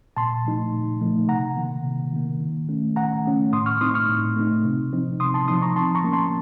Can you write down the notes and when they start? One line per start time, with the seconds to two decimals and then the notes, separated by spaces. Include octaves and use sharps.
0.17 A#2 A5 C6
0.45 F3 A3 D#4
0.73 A#2
1.01 F3 A3 D#4
1.29 C3 F#5 A#5
1.56 D#3 A#3
1.84 C3
2.13 D#3 A#3
2.41 D#3
2.69 A3 C#4
2.96 D#3 F#5 A#5
3.25 A3 C#4
3.52 A2 C6 D#6
3.66 C#6 F6
3.81 A3 C4 D#4 C6 D#6
3.94 C#6 F6
4.08 A2
4.36 A3 C4 D#4
4.65 C3
4.93 F3 C4 D#4
5.20 C3 C6 D#6
5.34 A5 C6
5.48 F3 C4 D#4 C6 D#6
5.62 A#5 C#6
5.76 F3 A5 C6
5.95 A#5 C#6
6.04 A#3 C#4
6.13 A5 C6